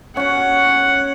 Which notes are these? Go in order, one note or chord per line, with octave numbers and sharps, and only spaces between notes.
C#4 F#4 F#5